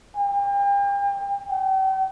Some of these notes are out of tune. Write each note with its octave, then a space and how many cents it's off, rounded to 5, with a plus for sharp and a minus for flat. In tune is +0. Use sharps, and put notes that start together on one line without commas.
G5 +40
G5 -40